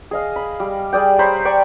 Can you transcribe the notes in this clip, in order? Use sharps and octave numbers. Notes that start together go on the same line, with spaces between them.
G#4 D#5 F5
B5
G3
G3 G#4 D5 G5
C5 C#5 A#5 B5
D5 G5 C#6